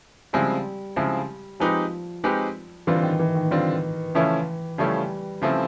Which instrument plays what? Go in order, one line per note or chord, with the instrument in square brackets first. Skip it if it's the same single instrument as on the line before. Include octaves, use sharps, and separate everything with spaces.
[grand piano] C#3 F3 G#3 C4 E4 [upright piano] G3
[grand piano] C#3 F3 G#3 C4 E4
[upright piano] F3 [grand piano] G#3 C4 D#4 G4 B4
[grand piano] G#3 C4 D#4 G4 B4
[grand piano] D3 G3 C4 F4 [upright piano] E3
[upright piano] D#3
E3
D#3
[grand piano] D3 G3 C4 F4
[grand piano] C#3 F3 A3 C#4 E4 [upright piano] E3
[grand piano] C#3 F3 A3 C#4 E4 [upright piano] G3
[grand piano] C#3 F3 A3 C4 E4